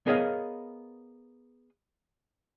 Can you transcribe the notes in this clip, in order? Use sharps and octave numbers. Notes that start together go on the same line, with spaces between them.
B3 G#4 A#4 C#5 D#5 F5